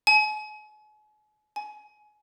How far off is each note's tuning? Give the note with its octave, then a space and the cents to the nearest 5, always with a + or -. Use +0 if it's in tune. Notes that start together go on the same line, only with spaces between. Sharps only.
G#5 +40
G#5 +25